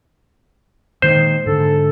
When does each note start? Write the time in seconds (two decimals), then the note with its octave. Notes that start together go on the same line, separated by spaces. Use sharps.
1.02 A#2 D#3 G#3 C5
1.46 G#2 D3 A4